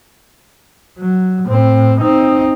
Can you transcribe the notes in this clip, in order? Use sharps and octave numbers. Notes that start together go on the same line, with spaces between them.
F#3
A2 C4
C4 D#4